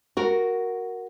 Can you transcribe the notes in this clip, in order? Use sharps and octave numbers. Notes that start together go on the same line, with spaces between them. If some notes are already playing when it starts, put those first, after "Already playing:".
F#4 A#4